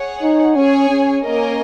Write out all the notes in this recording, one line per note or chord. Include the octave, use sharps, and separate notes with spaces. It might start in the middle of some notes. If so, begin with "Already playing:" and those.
Already playing: G#4 C#5 F#5
D#4
C#4 G#4 C#5 G#5
C#4
A#3 C#4 A#4 D#5